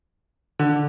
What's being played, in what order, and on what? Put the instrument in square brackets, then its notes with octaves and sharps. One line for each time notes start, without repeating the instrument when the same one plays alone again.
[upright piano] D3